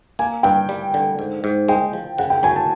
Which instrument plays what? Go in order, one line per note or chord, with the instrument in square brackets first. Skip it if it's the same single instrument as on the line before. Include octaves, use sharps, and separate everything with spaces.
[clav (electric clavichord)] A#3 [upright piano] G#5
[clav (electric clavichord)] G2 [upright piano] G5
[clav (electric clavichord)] G3
D3
G#2
G#2
[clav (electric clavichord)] G#3 [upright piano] G5
[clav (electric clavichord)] F3
[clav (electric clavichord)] C#3 [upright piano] F#5
[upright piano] G5
[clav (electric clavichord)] F#3 [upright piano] G#5
[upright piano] A5